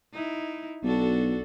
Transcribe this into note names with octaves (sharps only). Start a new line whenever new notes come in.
D#4 E4
B1 D4 F#4 A4